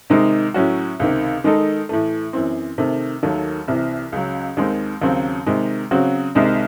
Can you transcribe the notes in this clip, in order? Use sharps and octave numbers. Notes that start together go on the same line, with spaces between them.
C3 D#3 G#3 D#4
A2 F#3 C#4 F#4
C#2 C3 D#3
D#3 G#3 D#4 A4
A2 E3 A3
F#2 E3 C4
C3 D#3 A3
D#2 D#3 F#3 A3
C2 C3 E3
C#2 C#3 F#3
D#2 D#3 G#3 C4
D#2 C#3 F#3 C4
C3 D#3 G#3
C#3 F#3 C4 F#4
C2 C3 D#3 G#3 D#4